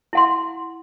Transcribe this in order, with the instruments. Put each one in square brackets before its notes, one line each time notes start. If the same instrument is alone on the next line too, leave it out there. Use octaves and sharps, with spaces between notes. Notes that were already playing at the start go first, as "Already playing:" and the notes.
[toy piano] E4 F#5 C6